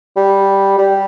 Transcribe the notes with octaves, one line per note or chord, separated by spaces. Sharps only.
G3
G3